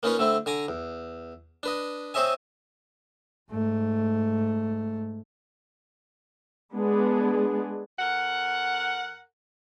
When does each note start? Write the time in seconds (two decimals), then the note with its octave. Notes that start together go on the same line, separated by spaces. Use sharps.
0.03 A#3 C#4 D#4 F4 B4 C#5
0.18 D3 A3 C4 E4
0.46 D3 G#5 A#5 D6
0.68 E2
1.63 D4 B4 D#5
2.14 C4 C5 C#5 D#5 E5 G#5
3.51 G#2 A3
6.73 G#3 B3 D4 G#4
7.99 F2 A#4 F#5